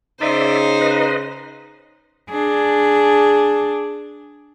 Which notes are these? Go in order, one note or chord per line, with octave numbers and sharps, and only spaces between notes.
C#3 D#4 C5 D5 E5
B4 D#5
D4 G#4